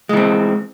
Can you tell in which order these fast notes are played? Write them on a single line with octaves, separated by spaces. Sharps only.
G#3 E3 C4